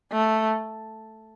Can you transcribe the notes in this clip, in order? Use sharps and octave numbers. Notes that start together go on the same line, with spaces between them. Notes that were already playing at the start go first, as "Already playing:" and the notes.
A3